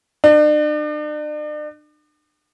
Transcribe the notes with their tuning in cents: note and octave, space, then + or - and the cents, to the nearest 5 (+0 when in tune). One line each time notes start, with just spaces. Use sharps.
D4 +40